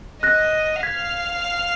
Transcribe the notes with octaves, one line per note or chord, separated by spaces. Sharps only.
D#5 F#6 A#6
F5 G#6 B6